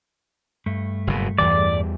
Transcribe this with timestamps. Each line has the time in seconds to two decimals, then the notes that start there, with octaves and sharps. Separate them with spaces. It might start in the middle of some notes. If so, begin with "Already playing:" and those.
0.66 G2 A3
1.07 F#1 B2
1.39 E2 E3 G3 D5